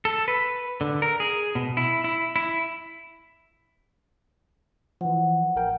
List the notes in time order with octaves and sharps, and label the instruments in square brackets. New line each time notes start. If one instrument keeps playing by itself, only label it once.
[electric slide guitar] A4
B4
D3
A#4
G#4
B2
E4
E4
E4
[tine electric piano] E3 F3 [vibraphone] F#5
[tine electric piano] A1 A#4 G5